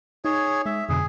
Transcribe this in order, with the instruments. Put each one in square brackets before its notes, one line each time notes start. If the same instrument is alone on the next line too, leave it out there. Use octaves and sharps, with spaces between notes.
[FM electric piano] D#4 [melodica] G#4 C#5
[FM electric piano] G#3 [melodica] E5
[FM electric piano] F2 B2 D3 [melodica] G#4